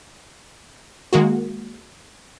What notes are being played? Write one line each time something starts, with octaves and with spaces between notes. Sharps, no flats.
D#3 G#3 A#3 F#4